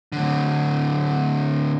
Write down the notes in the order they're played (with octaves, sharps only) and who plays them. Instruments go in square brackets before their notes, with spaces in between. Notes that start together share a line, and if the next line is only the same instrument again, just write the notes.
[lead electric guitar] A2 D3